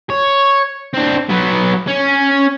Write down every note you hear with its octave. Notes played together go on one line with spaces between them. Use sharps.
C#5
C4 D4
F#3 B3
C#4